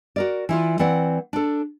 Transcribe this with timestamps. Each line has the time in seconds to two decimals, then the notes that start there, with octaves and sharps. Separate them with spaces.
0.16 F#4 A#4 D5
0.49 E3 E4 F4
0.79 E3 C4 D5 F#5
1.33 D4 A4